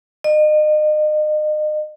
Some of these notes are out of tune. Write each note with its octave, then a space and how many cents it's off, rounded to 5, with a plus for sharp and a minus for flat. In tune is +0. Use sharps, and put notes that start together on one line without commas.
D#5 -35